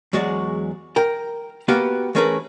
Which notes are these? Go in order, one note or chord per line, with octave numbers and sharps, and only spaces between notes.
E2 F#3 G#3 F#4 D5
A#4 G5
A#3 B3 F#4 G4 B4 F5
E3 A3 C#4 G#4 A#4 B4